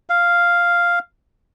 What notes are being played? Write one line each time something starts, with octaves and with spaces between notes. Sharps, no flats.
F5